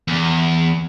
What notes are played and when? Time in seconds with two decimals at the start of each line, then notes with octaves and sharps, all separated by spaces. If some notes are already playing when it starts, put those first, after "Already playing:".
0.08 E2